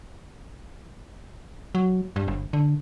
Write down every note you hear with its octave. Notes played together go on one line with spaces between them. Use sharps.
F#3
G2
G1
D3